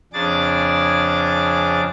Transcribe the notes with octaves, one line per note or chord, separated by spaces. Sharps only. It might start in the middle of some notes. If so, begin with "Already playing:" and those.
F2 C#3 D4 G#4 D6 A6